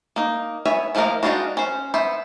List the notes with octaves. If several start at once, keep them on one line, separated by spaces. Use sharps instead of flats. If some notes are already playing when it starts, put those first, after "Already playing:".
A#3 D#4
B3 C#5 E5 G#5
D#3 F3 A3 A#3 A#4
G#3 D4 D#4 F4 F#4
C#4 C5
B3 C5 E5